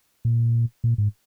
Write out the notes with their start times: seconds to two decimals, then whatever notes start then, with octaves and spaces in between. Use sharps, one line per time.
0.25 A#2
0.84 A#2
0.98 G#2